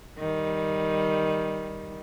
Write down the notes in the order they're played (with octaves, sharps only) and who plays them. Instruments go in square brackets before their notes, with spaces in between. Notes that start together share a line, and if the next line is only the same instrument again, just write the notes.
[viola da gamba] D#3 G3